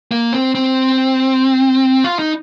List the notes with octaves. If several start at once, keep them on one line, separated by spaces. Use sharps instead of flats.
A#3
C4
C4
F4
D#4